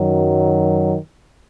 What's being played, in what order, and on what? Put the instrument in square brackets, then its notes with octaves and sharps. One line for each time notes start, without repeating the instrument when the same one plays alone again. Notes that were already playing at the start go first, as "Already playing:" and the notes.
Already playing: [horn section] F#2 D#3 F#3